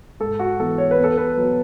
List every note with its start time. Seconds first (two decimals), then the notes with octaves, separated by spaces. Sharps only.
0.20 G#2 A4
0.39 F#4
0.59 E3 B3 A4
0.78 C#5
0.91 B4
0.98 E2
1.04 A4
1.17 B4
1.37 B2 F#3